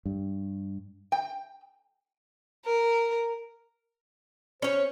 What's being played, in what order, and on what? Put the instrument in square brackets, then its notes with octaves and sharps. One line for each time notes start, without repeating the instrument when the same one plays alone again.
[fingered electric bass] G2
[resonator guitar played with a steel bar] G5
[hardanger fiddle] A#4
[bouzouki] C#4 C#5 [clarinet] C5